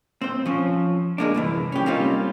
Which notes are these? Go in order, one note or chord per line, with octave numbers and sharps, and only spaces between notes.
C4 C5
F3 C#4
G#3 A#3 D4
C2 F#2 E3
C#4 G4
G3 A#3 C4 C#4 D#4 F4